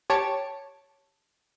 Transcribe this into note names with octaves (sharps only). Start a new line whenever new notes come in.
G4 C#5 A5 C#7 D7